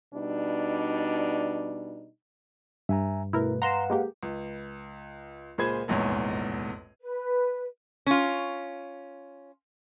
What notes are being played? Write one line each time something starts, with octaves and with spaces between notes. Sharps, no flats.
B2 G3 D4 D#4
G2 E5 G#5 A#5
B2 A3 E4 A#4 B4
B4 F5 F#5 A#5 C6 E7
G#3 A#3 G4
C#2
C#2 A#2 G#4 C5 B5 G#6
F1 A#1 E2 G#2 C#5 G#5
B4
C#4 F4